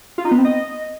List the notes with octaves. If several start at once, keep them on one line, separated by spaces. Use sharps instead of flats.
F4
D#4
B3
C4
D#5